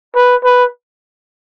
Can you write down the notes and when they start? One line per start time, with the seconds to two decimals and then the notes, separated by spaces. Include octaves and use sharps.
0.15 B4
0.44 B4